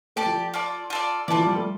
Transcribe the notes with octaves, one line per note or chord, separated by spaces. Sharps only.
A3 G4 D5 A5
F3
F4 A4 D5
F4 A4 D5
E3 F4 A4 D5
F3
G3
A3